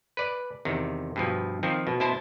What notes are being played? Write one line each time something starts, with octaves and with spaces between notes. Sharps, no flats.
B4 D5
E2 C3 D#3
G2 B2 F3
D#3 F3 C4
B2
B2 E4 C5 A5